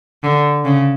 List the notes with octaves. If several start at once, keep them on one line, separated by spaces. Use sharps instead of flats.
D3
C#3